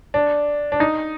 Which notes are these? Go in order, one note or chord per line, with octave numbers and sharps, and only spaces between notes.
D4
D4
D#4